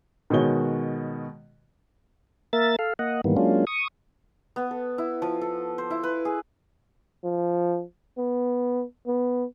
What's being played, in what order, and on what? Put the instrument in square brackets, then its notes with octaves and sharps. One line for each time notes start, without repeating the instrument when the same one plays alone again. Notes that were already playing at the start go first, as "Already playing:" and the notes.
[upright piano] B2 D#3 G#3 F#4 C#5 G7
[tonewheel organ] A#3 A#4 E5 A6
A4 F5
A#3 D#5 F#5
G#2 D#3 E3 G3 A#3 B3
F#3 G#3 A#3 C#4 D4 F4
C#6 D#6
[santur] B3
A4
E4
F3
A4
C5
E4
B4
G#4
[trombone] F3
B3
B3